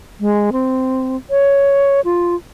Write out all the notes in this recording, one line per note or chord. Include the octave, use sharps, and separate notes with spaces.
G#3
C4
C#5
F4